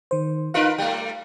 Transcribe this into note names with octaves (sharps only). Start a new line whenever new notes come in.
D#3 C5
D#4 F4 A#4 B4 F5
G3 A3 G5